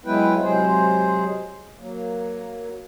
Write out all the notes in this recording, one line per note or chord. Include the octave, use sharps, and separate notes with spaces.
F#3 G#3 B3 E4 B4 G5
C3 F#3 G#3 G#4 C5
F#3 A#3